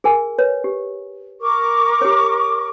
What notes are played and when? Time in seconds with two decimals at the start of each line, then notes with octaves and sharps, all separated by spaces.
0.04 G#4 A#4 G#5
0.39 B4 C#5
0.64 G4
1.41 A#4 C#6 D6
2.01 G4 C#5